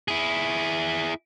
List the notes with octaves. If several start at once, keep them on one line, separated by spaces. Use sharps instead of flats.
E4 G#4